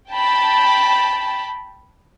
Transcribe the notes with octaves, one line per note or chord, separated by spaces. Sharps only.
G5 A5 B5